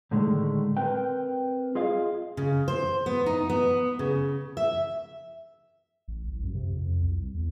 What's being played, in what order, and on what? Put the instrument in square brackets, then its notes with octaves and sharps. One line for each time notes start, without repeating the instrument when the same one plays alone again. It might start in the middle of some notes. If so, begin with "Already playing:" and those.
[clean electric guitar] A2 D3 D#3 G#3 A3
C4 A#4 B4 G5
F4 G#4 D#5 F5
[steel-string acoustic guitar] C#3
C5
B3
D#4
B3
C#3
E5
[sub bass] A1
C2
F#2
C3
F2
C2
E2